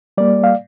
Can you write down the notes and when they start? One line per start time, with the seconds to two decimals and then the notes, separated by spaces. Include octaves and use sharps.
0.17 G3 A#3 D5
0.44 F5